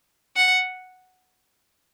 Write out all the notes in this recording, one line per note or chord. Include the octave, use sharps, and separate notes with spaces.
F#5